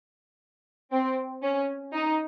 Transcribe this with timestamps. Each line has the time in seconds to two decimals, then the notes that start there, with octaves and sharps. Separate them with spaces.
0.92 C4
1.43 C#4
1.93 D#4